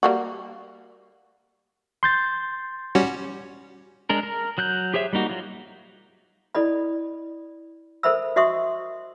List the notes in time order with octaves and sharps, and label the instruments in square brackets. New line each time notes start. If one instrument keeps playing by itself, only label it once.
[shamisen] G3 A#3 F#4
[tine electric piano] C6 G6 A6
[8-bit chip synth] G3 C#4 F#4
[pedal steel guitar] G#3 D4 A#4
A#4
F#3 F#6 G6
G4 G#4 C5 C#5 E5
G3 A#3 D#4 F#4
F#3 F4
[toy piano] E4 A4 D5 D#5 B5
A4 A#4 C5 E5 B5 E6
F#4 D#5 E5 C6 C#6 D#6